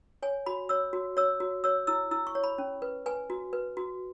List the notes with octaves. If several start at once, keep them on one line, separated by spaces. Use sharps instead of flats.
C#5 G#5
F#4 B5
C#5 E6
F#4
C#5 E6
F#4
C#5 E6
E4 E6
E4 E6
C#6
C#5
B5
C#4
B4
B4 G#5
F#4
B4
F#4